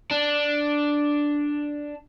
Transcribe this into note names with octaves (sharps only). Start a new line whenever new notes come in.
D4